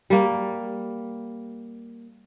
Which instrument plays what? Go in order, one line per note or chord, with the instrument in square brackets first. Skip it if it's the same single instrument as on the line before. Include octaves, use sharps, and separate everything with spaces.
[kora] G3 A#3